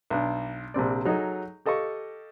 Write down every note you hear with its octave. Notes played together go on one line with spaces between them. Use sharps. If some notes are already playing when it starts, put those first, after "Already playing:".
B1 D4
A#1 C3 C4 D5
F#3 D#4 G#4 A4 D#5
G4 A4 D#5 F5 C#6